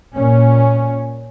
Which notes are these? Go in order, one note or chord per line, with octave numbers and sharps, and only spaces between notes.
A#2 C#4